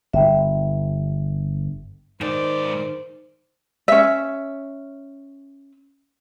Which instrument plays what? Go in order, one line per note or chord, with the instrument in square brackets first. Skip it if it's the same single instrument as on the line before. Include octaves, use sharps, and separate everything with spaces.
[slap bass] G1 [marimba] E5 G5
[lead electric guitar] G#2 D5 [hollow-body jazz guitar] D#3 [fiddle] C5
[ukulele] C#4 E5